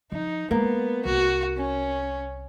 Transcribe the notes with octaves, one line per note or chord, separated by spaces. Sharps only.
F3 D#4
G#3 A#3 B3
C2 F#4
C#4